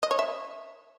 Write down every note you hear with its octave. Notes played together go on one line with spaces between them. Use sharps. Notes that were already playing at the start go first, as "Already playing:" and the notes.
D#5
C#5
E5